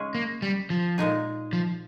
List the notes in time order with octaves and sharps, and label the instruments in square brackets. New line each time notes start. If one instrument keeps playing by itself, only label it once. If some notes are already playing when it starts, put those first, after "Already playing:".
Already playing: [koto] C#3 G#3 C#4 G#4
[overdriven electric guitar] A#3
G3
F3
[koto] A#2 G#3 D#4 G#4
[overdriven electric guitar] F3